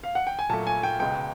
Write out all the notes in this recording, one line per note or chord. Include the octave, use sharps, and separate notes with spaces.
F5
F#5
G5
G#5
A#2 F#3 A3 A5
G#5
G5
C#2 B2 G#3 G5